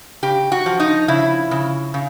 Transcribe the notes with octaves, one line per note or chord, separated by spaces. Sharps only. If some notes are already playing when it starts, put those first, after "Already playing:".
C#3 G4
F#4
F3
D#4
C#3 E4
C#3
C#3